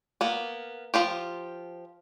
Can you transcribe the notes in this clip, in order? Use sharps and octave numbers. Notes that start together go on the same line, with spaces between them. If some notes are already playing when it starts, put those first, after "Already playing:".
A#3 B3
F3 F4 G4